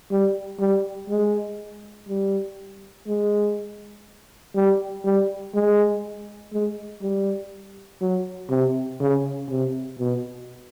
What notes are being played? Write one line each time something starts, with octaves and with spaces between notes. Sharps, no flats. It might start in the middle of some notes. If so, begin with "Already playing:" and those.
G3
G3
G#3
G3
G#3
G3
G3
G#3
G#3
G3
F#3
C3
C#3
C3
B2